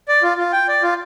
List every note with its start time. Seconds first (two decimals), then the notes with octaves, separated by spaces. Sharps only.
0.08 D5
0.23 F4
0.38 F4
0.53 G5
0.68 D5
0.83 F4